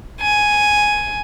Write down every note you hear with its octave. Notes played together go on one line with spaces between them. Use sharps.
G#5